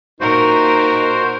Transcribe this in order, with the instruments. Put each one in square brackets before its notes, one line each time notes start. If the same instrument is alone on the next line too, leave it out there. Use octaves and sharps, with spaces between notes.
[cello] A#2 A#4 [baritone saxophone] D#4 [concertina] F#4 C5